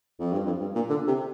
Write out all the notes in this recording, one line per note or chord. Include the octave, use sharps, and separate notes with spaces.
F2
G2
F2
G2
A#2
D3
C3